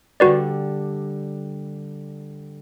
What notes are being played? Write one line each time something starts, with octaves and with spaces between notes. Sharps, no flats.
D3 G3 F#4 B4 D5